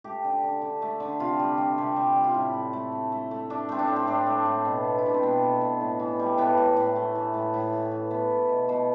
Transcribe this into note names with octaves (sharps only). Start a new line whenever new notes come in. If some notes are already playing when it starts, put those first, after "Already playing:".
A3 G4
D3
D3
D3
A3
D3
C3 F4
G3
G3
C3
G3
G3
F4
A2 E4
A2
A3
A2
A3
A3
A3 D4
A3 C4
D4
A2
C4
A2 D4
A3
A2
B2
B2
E4
B2 D4
C4
B2 B3
B2
B2
A2
E3
G3
A2 B3
A2
A2
A3
E3
A2
A2
A2
E3
A3 B3
A3
B2
B2